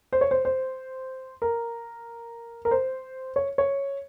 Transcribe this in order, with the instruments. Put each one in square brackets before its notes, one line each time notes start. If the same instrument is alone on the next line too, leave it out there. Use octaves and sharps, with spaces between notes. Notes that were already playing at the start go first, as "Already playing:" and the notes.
[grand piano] C5
C#5
C5
C5
A#4
A#4
C5
C#5
C#5